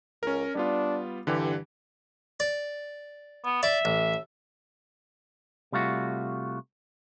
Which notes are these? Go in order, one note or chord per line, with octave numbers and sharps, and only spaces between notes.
C#2 C#4 A#4
G3 B3 D4 F4
G2 D3 E3 G4
D5
B3
D5 E5 D6
A1
C3 G3 A3 F4 F#4